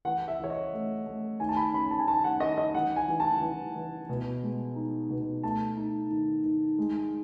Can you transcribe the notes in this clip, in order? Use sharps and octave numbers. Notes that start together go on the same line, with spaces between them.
E3 F#5
E5
E3 C#5
D#5
A3
A3
D#3 G#5
A5
B5
C#4 B5
A5
G#5
D#3 A5
F#5
D#3 D#5
D#5
E3 F#5
G#5
E3
A5
E3
E3
B2
G#3
D#4
B2
A3 A5
D#4
D#3
D#3
G#3